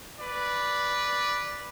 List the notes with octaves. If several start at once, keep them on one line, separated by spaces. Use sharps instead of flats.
B4 D5